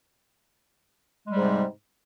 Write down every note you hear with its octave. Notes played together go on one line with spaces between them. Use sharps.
G#2 C3 G3 G#3